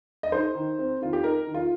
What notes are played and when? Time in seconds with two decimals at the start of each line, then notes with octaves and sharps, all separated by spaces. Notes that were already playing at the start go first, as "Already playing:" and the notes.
0.23 D#5
0.32 D#4 C5
0.55 D#3
0.79 C4
1.01 D#3 F4
1.13 G4
1.23 D#4 A#4
1.47 D#3
1.54 F4